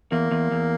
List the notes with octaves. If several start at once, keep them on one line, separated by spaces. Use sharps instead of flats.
E2 A#3
E2
E2